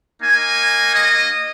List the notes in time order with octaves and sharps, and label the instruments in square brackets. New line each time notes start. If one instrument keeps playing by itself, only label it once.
[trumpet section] A#3 D#4 G#5
D#5